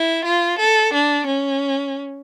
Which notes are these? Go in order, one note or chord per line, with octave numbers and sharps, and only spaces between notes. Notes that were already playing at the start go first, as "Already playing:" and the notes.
Already playing: E4
F4
A4
D4
C#4